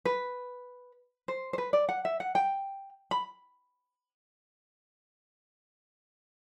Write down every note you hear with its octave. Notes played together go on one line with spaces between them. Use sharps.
B4
C5
C5
B4
D5
F#5
E5
F#5
G5
B5